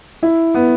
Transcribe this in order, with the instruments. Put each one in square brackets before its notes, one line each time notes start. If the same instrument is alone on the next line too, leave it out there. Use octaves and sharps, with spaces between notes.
[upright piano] E4
B3